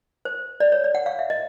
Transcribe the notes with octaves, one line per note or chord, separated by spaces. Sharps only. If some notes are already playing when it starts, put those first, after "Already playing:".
C5
D5
C#5
D5
F#5
F5
E5
D#5